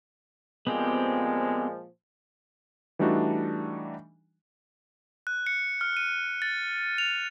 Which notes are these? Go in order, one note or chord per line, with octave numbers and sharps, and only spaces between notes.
A#2 F3 G#3 B3 C4 G4
E3 G3 A3 D4 D#4 F#4
F#6
C#7
F6
D#7
A6
F7